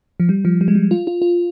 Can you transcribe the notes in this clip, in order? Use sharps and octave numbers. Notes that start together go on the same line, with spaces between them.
F3
G3
F3
G3
G#3
G3
F4
F4
F4